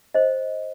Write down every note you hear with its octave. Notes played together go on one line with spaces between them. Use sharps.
C5 D#5